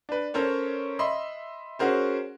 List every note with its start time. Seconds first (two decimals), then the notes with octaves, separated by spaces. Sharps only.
0.09 D4 B4
0.34 C#4 A4 A#4 C5 C#5
0.99 D#5 E5 B5 C6
1.79 C#4 F#4 G#4 A#4 C5